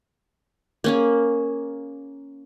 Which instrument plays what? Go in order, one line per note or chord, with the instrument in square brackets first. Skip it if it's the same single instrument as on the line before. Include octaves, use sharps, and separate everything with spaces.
[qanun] A#3 C#4 G#4